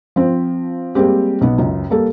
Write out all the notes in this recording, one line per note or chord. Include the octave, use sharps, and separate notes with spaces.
F3 C4
G3 G#3 A#3 C4 G4
B1 B3
C#2 F#2
G3 A#3 A4 A#4